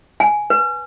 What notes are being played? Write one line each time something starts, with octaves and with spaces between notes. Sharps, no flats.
G#5
B4